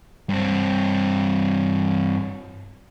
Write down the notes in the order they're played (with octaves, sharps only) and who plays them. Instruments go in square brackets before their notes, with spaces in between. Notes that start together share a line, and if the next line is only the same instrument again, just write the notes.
[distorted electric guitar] G2 C4